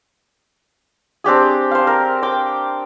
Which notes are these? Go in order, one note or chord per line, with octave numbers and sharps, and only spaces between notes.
C4 D4 G4 G#4
C5 F5
A#4
G5 D6